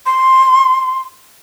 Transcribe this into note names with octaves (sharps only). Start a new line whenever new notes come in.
C6